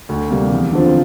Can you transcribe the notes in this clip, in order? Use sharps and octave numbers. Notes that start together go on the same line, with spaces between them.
D2
C3 G3 A#3
E2
D3 F3 C4 F4